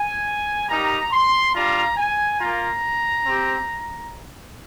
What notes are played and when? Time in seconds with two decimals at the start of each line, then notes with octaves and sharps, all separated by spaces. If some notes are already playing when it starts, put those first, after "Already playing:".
Already playing: G#5
0.68 G3 A#3 D#4 G4 A#5
1.12 C6
1.54 G3 D4 F4 A#5
1.97 G#5
2.40 A#3 F4 A#5
3.26 C4 G4